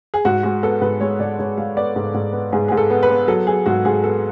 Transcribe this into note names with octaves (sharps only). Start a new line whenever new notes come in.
G#4
G#2 F#4
G#3 F#4
B3 A4
G#2 B4
G#3 C#5
G#2 D5
G#2 C#5
G#3 F5
B3 D5
G#2
G#2
B3
G#2 G#4
G#2 G#4
A4
B3
B4
B3
F#3 A4
F#3 G#4
G#2 F#4
G#2 G#4
B3 A4